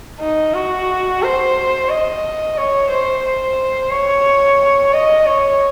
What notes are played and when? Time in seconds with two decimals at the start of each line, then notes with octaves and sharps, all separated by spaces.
0.20 D#4
0.54 F#4
1.22 C5
1.89 D#5
2.57 C#5
2.90 C5
3.24 C5
3.91 C#5
4.93 D#5
5.26 C#5